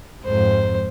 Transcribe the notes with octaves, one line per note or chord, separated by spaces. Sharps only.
F2 G#2 C5